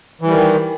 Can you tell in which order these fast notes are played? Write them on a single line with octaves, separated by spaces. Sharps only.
E3 G3 D#3